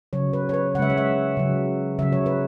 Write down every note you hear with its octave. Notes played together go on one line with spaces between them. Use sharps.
C#3 F#3 C#5
B4
C#5
B4
C#3 G#3 E5 F#5
C#5
E5
C#3 F#3
C#3 F#3 E5
C#5
B4